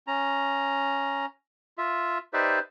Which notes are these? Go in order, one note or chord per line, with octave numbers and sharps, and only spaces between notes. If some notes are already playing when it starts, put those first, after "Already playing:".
C#4 A#5
F4 E5
D#4 G4 B4 C5 D5 E5